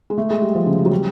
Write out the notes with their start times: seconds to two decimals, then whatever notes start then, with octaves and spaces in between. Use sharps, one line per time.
0.10 G#3
0.18 A3
0.30 G#3
0.42 G3
0.55 F3
0.66 C#3
0.78 G3
0.85 F#3
0.91 G3